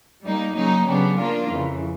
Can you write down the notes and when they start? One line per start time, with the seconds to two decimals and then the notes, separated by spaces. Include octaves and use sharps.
0.23 G3 A#3 D#4
0.55 C#3 F#3 A#3 D#4
0.86 C#3 F#3 B3 D4 G4
1.18 F3 A#3 D4 F4 A#4
1.50 F2 C#3 E3